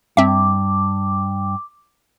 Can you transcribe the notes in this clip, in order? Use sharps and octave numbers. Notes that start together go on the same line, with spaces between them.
G2 C4 E5 D6